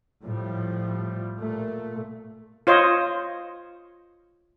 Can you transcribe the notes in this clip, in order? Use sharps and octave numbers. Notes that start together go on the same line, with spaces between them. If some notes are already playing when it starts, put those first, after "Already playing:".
A2 F3 G3
A#2 A3
F4 C5 C#5 D#5